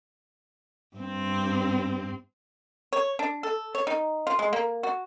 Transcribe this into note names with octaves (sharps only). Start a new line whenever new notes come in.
G2 C4
C#5
D4
A4
C#5
D#4
F4
G#3
A#3
F#4